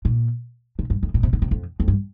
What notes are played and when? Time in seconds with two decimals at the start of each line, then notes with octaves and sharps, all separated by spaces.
0.05 A#2
0.79 C3
0.90 G2
1.03 F2
1.14 A#2
1.23 C3
1.33 D3
1.42 C3
1.51 F2
1.80 F2
1.88 G2